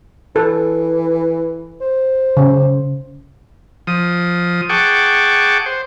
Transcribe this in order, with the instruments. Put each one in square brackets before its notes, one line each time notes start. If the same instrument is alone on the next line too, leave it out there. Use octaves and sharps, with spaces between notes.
[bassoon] E3 [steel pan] A4
[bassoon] C5
[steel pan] C#3
[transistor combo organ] F3 D#6
G#4 F#5 G5 A5 C#6 D6
C5